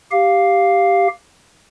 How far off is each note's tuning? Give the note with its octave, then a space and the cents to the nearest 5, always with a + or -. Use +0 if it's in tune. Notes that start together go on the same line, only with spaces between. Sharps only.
G4 +0 F5 +0